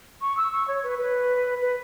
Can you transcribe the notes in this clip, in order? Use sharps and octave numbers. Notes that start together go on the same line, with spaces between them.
C#6
E6
C#6
C#5
B4
B4
B4